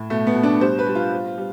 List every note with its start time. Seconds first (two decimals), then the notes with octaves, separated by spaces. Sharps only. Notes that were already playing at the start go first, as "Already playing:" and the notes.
Already playing: A2
0.10 B2 A3
0.27 B3
0.35 B2
0.43 D4
0.61 G3 C5
0.79 B4
0.87 G3
0.95 F4
1.12 G3
1.38 G3